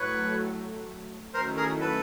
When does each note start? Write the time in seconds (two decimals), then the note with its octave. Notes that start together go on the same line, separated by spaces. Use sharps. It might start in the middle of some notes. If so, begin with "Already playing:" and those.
Already playing: A2 F#3 A3 B4 C#5
1.34 D#3 F#3 A3 C#4 E4 A#4 C5
1.57 G#4 A#4
1.81 A4 B4